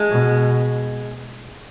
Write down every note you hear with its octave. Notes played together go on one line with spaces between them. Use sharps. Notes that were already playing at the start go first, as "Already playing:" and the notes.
Already playing: G#3
B2